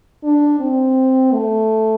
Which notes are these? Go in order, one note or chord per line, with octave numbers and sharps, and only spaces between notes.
D4
C4
A3